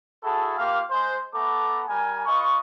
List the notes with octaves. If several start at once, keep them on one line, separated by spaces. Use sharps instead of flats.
E4 F#4 G#4 A4
A#3 F4 G4 F5
G#3 C5
A3 B3 A4 A#5 D6
G3 A#4 G#5
F4 B4 D#5 C#6